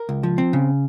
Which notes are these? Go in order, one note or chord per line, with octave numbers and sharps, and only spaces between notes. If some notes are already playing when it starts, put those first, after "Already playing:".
Already playing: A#4
C#2
F3
C4
C#3